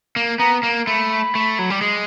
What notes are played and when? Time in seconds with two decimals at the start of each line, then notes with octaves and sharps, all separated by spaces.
0.16 A#3
0.39 B3 A#5
0.63 A#3
0.87 A3 B5
1.35 A3
1.59 F#3
1.70 G3
1.81 G#3